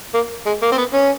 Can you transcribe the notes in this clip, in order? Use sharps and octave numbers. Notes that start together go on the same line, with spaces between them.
A#3
G#3
A#3
C4
B3
C#4